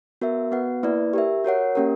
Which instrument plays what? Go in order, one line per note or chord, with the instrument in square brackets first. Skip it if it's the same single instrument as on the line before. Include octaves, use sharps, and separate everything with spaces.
[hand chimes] B3 F#4 A#4 E5
B3 F#4 B4 F#5
A#3 E4 B4 D5
G4 A#4 E5
F#4 A#4 C#5 F#5
A#3 C#4 G4 A#4